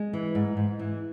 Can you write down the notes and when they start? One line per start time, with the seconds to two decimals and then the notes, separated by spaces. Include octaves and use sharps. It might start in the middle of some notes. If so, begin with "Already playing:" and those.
Already playing: G#3
0.13 E3
0.35 G#2
0.57 G#2
0.79 E3